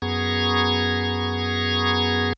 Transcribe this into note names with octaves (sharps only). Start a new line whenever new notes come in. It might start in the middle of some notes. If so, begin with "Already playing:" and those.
F#2 B3 G#4 A#5 C#6 G#6